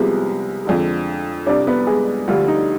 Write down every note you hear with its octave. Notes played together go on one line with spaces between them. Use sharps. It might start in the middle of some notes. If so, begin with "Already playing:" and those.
Already playing: C2 C3 F3 G#3 B3 G#4
F2 D3 G#3
C2 C3 G3 D4 D5
B3 B4
G#3 G#4
D2 D3 F3 G3 F4
D#4